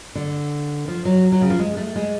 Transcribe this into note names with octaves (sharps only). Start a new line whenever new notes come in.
D3
F3
F#3
F#3
C#3
F3
G#3
A3
G#3